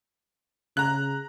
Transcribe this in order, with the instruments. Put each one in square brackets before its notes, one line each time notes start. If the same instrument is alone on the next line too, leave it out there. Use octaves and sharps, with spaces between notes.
[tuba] C#3 [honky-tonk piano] A#5 F#6